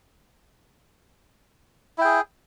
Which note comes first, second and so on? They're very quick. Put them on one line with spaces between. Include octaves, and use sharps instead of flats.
E4 G5 G#4